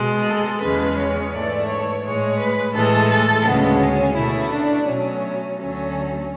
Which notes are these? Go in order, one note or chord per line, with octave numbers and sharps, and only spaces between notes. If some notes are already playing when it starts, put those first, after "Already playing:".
Already playing: B2 G#3
A4
E2 C#3 G#3 B4
C#5
G#2 E3 A3 D5
C#5
A2 G#3 C#5
B4
A2 E3 G#3 A4
A4
D2 C#3 G#3 B3
C#4
B2 A3 E4
D4
B2 F#3 A3 C#4
D2 D3 F#3 A3 C#4